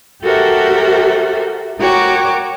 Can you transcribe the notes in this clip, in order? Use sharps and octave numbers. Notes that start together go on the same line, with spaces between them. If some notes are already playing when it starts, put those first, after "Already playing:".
F#4 G4 A4 A#4 C5 E5
F#4 A#4 C#5 G5 D6